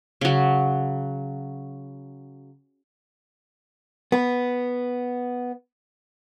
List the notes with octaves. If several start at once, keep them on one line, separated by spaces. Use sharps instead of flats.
C#3 F#3
B3 B4